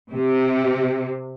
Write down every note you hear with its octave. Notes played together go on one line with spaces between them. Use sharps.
C3